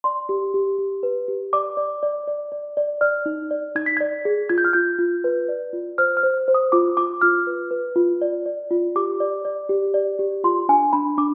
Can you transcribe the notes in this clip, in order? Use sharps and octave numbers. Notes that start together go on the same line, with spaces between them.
D5 C6
G4
G4
G4
B4
G4
D5 D6
D5
D5
D5
D5
D5
D5 F6
D#4
D5
D#4 G#6
B6
D5 G#6
G#4
F4 G#6
G6
F6
F4 G6
F4
B4
D5
F4
C5 F6
F6
C5
C5
D#6
F4 D6
F4 D6
F4 F6
B4
B4
F4
D5
D5
F4
G4 D6
D5
D5
G4
D5
G4
F4 C6
D4 G#5
D4 B5
D4 D6